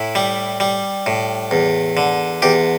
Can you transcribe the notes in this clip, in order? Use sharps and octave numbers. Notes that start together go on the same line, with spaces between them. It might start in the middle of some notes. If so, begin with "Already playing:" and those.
Already playing: A2 E4
G3
G3
A2
E2
D3
E2 G4